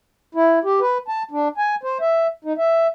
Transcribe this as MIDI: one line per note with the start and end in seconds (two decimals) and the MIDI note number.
0.35 0.59 64
0.64 0.80 67
0.81 0.98 71
1.08 1.23 81
1.31 1.48 62
1.58 1.75 80
1.83 1.98 72
2.01 2.27 76
2.45 2.53 63
2.58 2.87 76